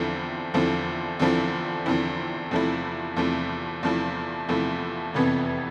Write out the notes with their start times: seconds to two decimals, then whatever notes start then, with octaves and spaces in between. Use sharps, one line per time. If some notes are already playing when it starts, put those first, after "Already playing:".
Already playing: E2 D3 F3 C4 E4
0.54 E2 D3 F3 C4 E4
1.19 E2 D3 F3 C4 E4
1.86 E2 D3 F3 C4 E4
2.51 E2 C3 F3 A3 E4
3.16 E2 C3 F3 A3 E4
3.83 E2 C3 F3 A3 E4
4.49 E2 C3 F3 A3 E4
5.14 F1 F2 C3 E3 B3